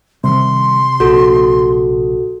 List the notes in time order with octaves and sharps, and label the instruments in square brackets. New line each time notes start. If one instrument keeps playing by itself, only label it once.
[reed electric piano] C3 [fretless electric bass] D#3 G3 [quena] C6
[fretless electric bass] A#1 [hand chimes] F#4 A4